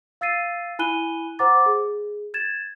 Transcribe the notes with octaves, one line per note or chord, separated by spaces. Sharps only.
F5 E6 A6 C7 D#7
E4 G#5 B5 F#6 D#7 G7
C5 F#5 A#5 D6 A6
G#4
G#6 A6 E7